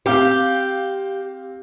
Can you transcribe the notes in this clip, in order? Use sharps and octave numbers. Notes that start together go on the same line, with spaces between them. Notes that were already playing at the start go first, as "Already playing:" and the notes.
C4 G4 F5